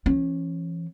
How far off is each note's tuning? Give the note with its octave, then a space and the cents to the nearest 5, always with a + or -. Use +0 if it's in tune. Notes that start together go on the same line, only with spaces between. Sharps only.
E3 +30 C#4 -20